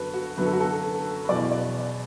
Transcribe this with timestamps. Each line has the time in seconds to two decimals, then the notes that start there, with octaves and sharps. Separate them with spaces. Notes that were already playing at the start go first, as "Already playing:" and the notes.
Already playing: F#2 D3 F#4 A4 B4
0.14 F#4
0.37 F#2 D3 F#3 B4
0.45 A4
0.53 F#4
0.60 A4
1.24 B4
1.29 E2 B2 F#3 D5
1.52 D5